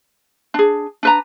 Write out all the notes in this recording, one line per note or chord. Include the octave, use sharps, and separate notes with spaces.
D4 G#4
D4 B4 A#5